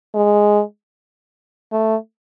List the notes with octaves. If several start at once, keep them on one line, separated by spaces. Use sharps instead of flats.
G#3
A3